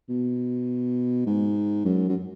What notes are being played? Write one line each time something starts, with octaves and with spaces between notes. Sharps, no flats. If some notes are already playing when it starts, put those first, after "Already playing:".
B2
G#2
F#2
F#2